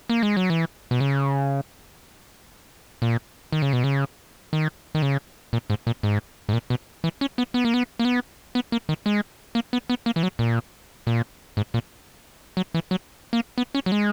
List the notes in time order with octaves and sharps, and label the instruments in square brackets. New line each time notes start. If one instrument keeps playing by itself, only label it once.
[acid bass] A#3
G#3
F#3
E3
B2
C#3
A#2
D#3
C#3
B2
C#3
D#3
D#3
C#3
A#2
G#2
A#2
G#2
G#2
A#2
B2
E3
C#4
B3
B3
A#3
B3
A#3
B3
B3
A#3
D#3
G#3
A#3
B3
B3
A#3
E3
F#3
A#2
A#2
G#2
A#2
F#3
E3
F#3
A#3
B3
C#4
F#3
G#3